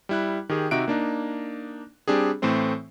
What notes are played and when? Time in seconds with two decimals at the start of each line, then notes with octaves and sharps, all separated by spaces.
0.09 G3 E4 F#6
0.49 D#3 G4 G#4
0.71 C3 D#4 F#4 E5 F#6 D7
0.88 A#3 D4 D#4
2.08 G3 C4 D4 G4 G#4
2.42 A2 E3 A3 C4 C5